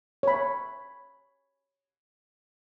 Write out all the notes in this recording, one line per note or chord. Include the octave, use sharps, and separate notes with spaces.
C#5 B5